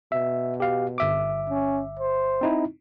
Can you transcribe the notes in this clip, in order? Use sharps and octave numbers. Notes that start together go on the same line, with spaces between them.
B2 E5
G4 F5
G1 E5 D6
C#4
C5
C4 D#4 E4